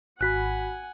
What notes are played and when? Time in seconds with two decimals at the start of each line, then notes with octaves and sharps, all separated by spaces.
0.21 G#1 F#4 F#5 G#5 B5 F#6 B6